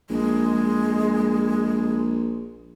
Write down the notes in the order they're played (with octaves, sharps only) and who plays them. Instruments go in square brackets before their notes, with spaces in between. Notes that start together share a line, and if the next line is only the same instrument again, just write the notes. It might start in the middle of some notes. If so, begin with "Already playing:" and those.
[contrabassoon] A#1 [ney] G#3